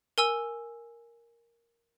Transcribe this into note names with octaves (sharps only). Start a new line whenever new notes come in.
A#4 G#5 E6